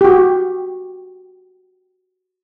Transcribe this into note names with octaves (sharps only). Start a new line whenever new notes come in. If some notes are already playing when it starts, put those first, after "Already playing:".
F#4 G4